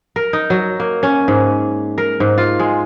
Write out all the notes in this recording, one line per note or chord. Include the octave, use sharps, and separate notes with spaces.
A#4
D#4
F#3
A#3
C#4
G#2
A#4
G#2
F4
G#3